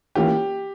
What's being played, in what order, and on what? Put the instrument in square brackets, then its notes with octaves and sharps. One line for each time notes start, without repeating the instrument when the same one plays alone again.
[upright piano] E3 A#3 C#4 F4 [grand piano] G4